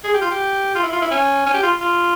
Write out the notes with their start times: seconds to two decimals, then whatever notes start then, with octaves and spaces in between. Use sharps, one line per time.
0.04 G#4
0.14 G4
0.21 F4
0.31 G4
0.75 F4
0.83 E4
0.92 F4
1.01 E4
1.11 C#4
1.46 C#4
1.54 G4
1.63 F4
1.81 F4